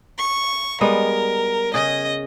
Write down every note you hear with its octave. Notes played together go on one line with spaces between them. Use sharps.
C#6
G3 G#3 B3 A#4
C#3 G#4 D#5